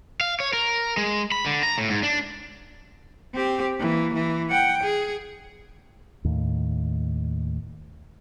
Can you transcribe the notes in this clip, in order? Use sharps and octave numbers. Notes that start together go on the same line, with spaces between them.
F5
C#5
A#4
G#3
B5
D3
A#5
A2
G#2
D4
C4 G4
E3 A#3
E3
F#5 G5
G#4
D#2 A2